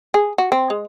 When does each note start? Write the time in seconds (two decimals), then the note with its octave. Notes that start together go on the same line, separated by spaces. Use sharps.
0.14 G#4
0.38 F#4
0.52 C4
0.70 G#3